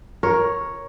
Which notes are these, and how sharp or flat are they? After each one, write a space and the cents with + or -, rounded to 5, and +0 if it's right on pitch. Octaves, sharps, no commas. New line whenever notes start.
A#4 +10 C#5 +0